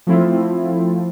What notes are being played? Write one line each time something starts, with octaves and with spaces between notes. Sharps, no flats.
F3 A3 C4 E4 F4